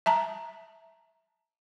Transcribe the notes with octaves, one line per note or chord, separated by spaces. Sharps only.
E5 A5 A#5